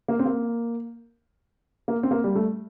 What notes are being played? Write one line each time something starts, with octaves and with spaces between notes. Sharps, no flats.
A#3
C4
A#3
A#3
C4
A#3
G3
A3